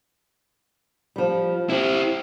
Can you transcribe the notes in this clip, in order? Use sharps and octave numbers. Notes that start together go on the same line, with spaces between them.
F3 G3
C4 E4 G4